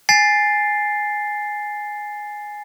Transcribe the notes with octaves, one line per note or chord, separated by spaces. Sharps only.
G#5 A6 C7